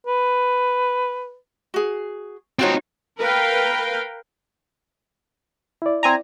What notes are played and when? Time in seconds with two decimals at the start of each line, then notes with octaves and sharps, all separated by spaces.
0.07 B4
1.74 F#4 G#4
2.59 C4 D#4 F4 F#4 C#5
3.18 A#4 B4 F5 G5
5.82 E4 D5
6.03 C4 G#5 A#5